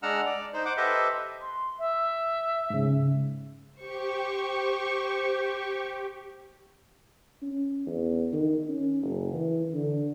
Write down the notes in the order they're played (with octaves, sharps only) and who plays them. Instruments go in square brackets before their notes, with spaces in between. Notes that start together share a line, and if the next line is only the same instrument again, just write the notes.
[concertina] G#3 D4 F#5 A#5 E6 F6
D5
D#4 C5
C5 F#5 D6
G4 A4 B4 C5 D#5 E5
[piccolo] C6
E5
[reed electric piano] G#2 C#3
[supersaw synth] G4 [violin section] C5 C#6
[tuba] C#4
E2
D#3
C#4
F#1
E3
D3